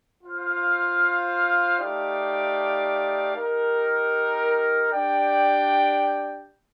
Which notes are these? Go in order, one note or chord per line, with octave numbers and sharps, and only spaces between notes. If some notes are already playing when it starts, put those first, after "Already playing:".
F4 C5 F5
A3 D#4 G4 D5 F5
D#4 G4 A#4
D4 G4 D5 G5